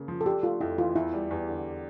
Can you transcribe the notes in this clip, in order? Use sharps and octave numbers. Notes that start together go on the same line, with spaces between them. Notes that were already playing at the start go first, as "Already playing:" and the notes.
Already playing: C#3 A#3
F3
A4
D4 G4
A3 F4
F2 E4
E3 F4
E2 E4
G3
E2
D3